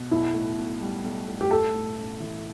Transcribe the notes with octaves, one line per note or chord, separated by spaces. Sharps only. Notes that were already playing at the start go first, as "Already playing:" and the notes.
Already playing: B2
B1 E4
A2
B1
G3
B1
A2
G4
A3 A4
A2
A1
E3